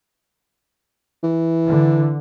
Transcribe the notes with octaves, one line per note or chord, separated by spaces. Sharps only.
E3
D3